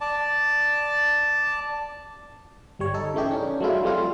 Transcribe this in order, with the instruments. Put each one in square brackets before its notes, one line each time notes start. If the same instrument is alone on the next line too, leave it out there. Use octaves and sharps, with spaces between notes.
[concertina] D5 A5
[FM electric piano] G1 G3 C#5
D#4 A4
C#3 E3 A3 D#4 G4
C#4 D4
F#3 G#3 A3 D4 E4 F4
F3 G3 A3 C4 F4